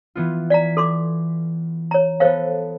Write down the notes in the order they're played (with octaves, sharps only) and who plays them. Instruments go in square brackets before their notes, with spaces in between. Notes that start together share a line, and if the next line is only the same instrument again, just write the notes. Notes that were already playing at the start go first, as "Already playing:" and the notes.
[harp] E3 B3 F4
[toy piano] D5 A#5 [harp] G#5 B6
[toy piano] A4 C6 D6
C#5 A#5
[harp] B3 A4 [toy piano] C5 C#5 F5